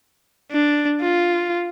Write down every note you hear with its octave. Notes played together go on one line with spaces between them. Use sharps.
D4
F4